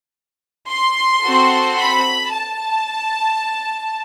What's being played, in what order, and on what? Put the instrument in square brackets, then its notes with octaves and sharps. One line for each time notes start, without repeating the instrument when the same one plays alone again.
[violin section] C6
C4 F#4 A4
B5
A5